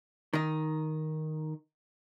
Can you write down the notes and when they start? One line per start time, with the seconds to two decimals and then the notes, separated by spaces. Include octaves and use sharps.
0.33 D#3 D#4